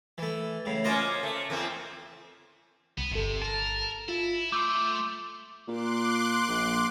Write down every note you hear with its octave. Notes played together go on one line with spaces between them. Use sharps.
E3 A3
A2 C#3
A#3 C#4 F4 C5 D#5
A3
E2 A#3 C4
C2 B3
G1 C3 A4
A#4 A5
E4 F4
A3 C6 D6 E6 G6
A#2 C6 D6 F#6
A#1